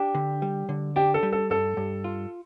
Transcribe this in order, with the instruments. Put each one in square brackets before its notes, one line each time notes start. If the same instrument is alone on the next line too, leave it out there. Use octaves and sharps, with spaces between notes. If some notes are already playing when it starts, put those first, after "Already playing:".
Already playing: [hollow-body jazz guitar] D4 [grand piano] G4
[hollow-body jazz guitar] D3
G3
D3
[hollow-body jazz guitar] D4 [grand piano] G4
[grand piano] A4
[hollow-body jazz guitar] G3
[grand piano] A4
[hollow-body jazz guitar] G2 [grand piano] A4
[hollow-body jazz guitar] G2
F4